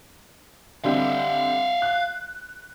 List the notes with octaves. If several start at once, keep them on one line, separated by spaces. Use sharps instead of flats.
D3 G3 C4 E5 F5
F#6